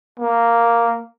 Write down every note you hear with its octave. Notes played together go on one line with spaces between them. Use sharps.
A#3